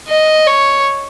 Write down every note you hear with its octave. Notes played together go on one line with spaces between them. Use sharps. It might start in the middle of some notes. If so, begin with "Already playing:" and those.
D#5
C#5